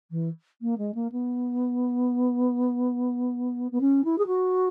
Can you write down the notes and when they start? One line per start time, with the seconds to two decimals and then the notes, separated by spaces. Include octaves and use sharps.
0.11 E3
0.62 A#3
0.78 G#3
0.94 A#3
1.11 B3
3.71 B3
3.81 C#4
4.04 E4
4.18 G#4
4.26 F#4